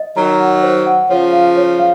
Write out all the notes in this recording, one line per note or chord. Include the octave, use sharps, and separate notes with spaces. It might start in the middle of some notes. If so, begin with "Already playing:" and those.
Already playing: D#5
D#3 F#3 A#5
F#5
C5
F#5
C#3 F3 C#5
F5
C#5
F5